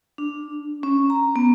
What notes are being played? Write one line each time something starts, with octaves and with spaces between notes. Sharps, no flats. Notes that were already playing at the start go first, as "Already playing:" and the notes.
D4
C#4
A#5
B3